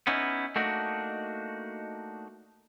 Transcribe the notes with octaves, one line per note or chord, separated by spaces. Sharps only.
B3 C#4 D#4 E4
A3 A#3 D4 D#4 F#4